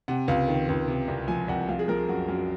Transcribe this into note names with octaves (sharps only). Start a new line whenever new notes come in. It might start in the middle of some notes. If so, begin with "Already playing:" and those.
C3 F#5
C#2 F5
D#3
C#2
C3
C2
F3 G#5
C2 F#5
F3 F5
G#4
F3 A#4
G#4
F#2 F#4
F#2